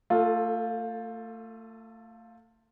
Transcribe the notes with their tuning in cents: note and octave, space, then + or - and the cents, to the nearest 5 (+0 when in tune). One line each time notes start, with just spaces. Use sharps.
A3 +35 F4 +10 A4 +0